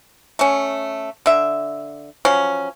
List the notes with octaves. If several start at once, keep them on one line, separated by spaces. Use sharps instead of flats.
A3 C#4
D3 E5
F3 F#3 C#4